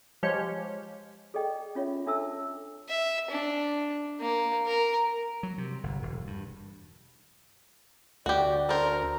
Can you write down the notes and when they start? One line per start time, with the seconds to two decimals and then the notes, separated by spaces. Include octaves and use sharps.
0.23 F3 G#3 G4 C#5
1.34 G#4 A4 D5 D#5 G5
1.75 C#4 F4 C#5 E5
2.07 D4 A4 E5 A5 E6
2.89 E5
3.30 D4
4.21 A#3
4.66 A#4
5.43 F#3
5.58 C3
5.83 G1
6.02 E1
6.27 G2
8.26 D2 F#4 G4 D5
8.69 A4 A#4 C5